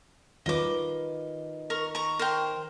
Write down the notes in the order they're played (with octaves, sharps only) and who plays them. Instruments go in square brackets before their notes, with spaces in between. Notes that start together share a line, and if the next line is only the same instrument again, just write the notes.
[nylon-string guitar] D#3 F4 B4 [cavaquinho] D#5 D6
[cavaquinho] A#4 C#6
A#5 C#6
A#4 C5 G5